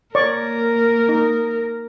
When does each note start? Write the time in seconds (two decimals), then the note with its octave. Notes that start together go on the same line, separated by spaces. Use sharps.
0.15 A#3 A#4 C#5 D5 C#6
1.09 D#4